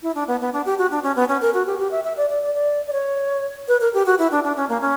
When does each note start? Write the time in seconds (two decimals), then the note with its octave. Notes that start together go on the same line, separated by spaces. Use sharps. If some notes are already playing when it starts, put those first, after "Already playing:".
0.03 E4
0.15 D4
0.28 B3
0.41 B3
0.53 D4
0.66 G4
0.78 F#4
0.91 D4
1.03 C#4
1.16 B3
1.28 C#4
1.41 A#4
1.54 F#4
1.67 G4
1.79 G4
1.91 E5
2.04 E5
2.17 D5
2.30 D5
2.42 D5
2.55 D5
2.87 D5
2.93 C#5
3.68 B4
3.81 A#4
3.94 G4
4.06 F#4
4.18 E4
4.31 D4
4.44 D4
4.56 C#4
4.69 A#3
4.81 C#4